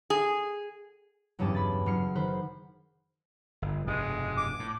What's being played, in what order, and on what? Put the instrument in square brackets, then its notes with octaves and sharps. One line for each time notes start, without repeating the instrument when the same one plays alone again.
[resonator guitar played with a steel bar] G#4
[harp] F#1 E2 G2 C#4 A5 D6
B5 A6
F#1 F#3 F6 C7 C#7
D#3 B4 C5
[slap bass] G1
[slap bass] F1 G2 B2 [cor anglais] G#3
[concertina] D6
[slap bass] A2